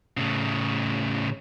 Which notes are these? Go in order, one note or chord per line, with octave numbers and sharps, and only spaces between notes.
A2 C#3